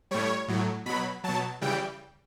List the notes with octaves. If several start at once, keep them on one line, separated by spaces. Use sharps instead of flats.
A2 G3 C#5
A2 F#3
B2 F#3 B5
B2 F#3 A5
C#3 E3 G3 G5